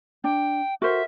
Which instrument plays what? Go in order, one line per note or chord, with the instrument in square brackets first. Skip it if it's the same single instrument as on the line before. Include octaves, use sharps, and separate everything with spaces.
[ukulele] D4 [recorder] G5
[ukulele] F#4 A#4 C5 [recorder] E5